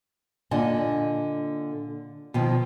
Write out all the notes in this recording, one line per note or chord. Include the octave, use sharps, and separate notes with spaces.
A#2 D3 D#5 G#5 A5
B2 D#3 F3